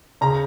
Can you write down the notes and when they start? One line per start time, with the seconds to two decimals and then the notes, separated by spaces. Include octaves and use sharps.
0.21 C#3 A#5